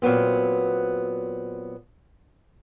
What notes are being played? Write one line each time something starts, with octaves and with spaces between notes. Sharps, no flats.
A#2 F#3 B3 C4